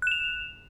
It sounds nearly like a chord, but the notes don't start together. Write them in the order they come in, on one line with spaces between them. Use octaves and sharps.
F#6 E7 F7